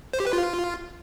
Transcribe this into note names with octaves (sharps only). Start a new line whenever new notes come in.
C5
G4
B4
F4